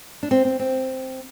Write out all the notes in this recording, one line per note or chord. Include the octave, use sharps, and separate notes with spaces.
D4
C4
C4
C4